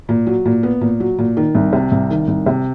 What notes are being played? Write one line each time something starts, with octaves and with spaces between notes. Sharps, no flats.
A#2
F#3
A#2
B3
A#2
F#3
A#2
D#3
C2
C3
C2
D#3
C2
C3